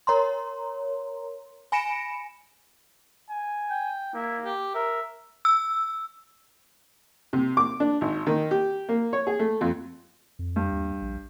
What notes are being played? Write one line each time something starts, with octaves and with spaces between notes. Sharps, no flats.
A#4 C#5 A#5 C6
G#5 B5 A#6 C#7 D7 E7
G#5
G5
A#3 E4
G4
A#4 E5
E6
C3
D6
D4
G#1
D#3
G4
A#3
C#5
G#4
A3
F2
F2
G2
D#2
A#1